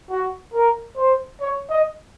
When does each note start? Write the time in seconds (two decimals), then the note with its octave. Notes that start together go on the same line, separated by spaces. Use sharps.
0.09 F#4
0.54 A#4
0.97 C5
1.40 C#5
1.69 D#5